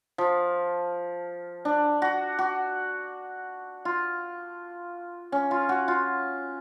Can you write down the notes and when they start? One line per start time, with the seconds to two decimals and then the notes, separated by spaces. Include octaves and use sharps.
0.18 F3
1.65 D4
2.02 F#4
2.39 F#4
3.85 F4
5.32 C#4
5.51 F4
5.69 F#4
5.88 F4